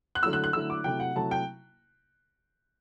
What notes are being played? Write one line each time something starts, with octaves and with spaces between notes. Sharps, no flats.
F#6
D3 F#3 A3 E4 E6
F#6
F#6
D3 F#3 A3 E4 E6
D6
C3 F#3 A3 E4 G5
F#5
C3 F#3 A3 E4 A5
G5